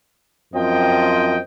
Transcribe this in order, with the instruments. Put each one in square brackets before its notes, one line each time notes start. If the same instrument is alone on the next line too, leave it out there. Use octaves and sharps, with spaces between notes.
[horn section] F#2 F3 C4 D#5 G5